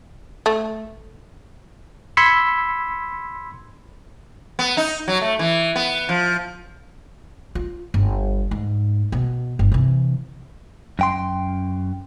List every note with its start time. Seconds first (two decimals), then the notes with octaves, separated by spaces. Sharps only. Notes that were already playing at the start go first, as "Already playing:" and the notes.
0.46 A3
2.17 B5 C6 E6 G#6 B6 C#7
4.59 B3
4.77 D#4
5.08 F#3
5.21 A3
5.39 E3
5.76 B3
6.09 F3
7.55 F4
7.94 G1
8.51 G#2
9.12 B2
9.59 G1
9.72 C3 E3
10.99 F#2 G5 C6